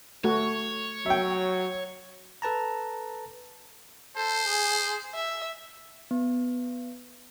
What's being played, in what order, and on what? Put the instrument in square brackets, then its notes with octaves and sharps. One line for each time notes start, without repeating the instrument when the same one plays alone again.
[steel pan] A3 F#4 [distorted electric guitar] C#5
[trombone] F#3 [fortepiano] E5 G5
[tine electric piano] A4 B4 A5 A#5
[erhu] A4 [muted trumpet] C5
[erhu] G#4
E5
[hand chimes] B3